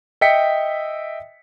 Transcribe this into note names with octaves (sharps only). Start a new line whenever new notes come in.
D#5 E5 G5 B6 C#7